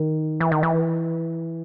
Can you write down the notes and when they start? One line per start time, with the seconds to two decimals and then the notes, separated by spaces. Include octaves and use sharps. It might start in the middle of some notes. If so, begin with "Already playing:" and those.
Already playing: D#3
0.40 E3
0.52 D#3
0.63 E3